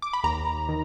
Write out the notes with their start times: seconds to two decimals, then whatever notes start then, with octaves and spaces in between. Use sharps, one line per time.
0.02 D6
0.13 B5
0.24 D#2 A#5
0.69 D#3